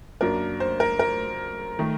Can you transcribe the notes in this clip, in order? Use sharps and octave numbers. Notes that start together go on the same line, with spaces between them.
F#2 F#3 A#3 D4 A#4
C5
A#4
A#4
D#3 A3